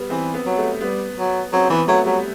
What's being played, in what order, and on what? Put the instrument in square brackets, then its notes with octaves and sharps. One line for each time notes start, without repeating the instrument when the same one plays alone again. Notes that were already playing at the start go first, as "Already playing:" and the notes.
Already playing: [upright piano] G3 B3
[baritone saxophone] E3 [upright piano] C4
[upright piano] B3
[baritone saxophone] F#3
[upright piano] A3
[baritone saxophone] G3 [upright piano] B3
[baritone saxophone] F#3
[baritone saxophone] F#3 [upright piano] C4
[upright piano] C4
[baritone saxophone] E3 [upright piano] B3
[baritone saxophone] F#3 [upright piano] A3
[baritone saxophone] F#3 [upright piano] G3